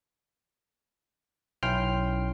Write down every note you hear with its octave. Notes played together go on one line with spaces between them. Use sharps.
B1 C#4 E4 G5 C6 F6